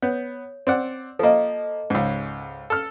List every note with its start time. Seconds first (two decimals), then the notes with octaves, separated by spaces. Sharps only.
0.02 B3 C#5
0.67 C4 D5 F#5
1.19 F3 A#3 A4 D#5
1.90 C#2 G#2
2.70 A4 F6